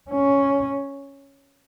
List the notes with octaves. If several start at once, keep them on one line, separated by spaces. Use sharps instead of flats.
C#4